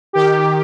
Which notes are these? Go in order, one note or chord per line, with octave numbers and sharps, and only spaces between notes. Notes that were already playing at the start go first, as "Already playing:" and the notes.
D#3 G4